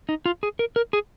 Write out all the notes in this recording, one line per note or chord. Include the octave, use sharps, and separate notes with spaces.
D#4
F4
G#4
A#4
A#4
G#4